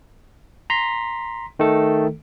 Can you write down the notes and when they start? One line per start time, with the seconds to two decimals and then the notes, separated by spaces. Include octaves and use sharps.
0.70 A#5 C6 B6
1.59 D#3 A3 A4